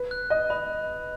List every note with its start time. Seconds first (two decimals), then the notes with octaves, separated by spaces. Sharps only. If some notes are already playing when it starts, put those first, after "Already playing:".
Already playing: B4
0.11 F#6
0.30 D#5 F#6
0.50 D#5 B5